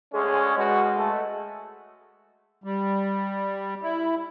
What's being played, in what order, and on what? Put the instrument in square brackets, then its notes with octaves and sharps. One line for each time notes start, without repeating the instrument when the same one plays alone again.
[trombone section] D2 G#3 C#4 [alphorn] G#4
[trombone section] B2 F#4 [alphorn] G#3
[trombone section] A3
[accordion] G3
E4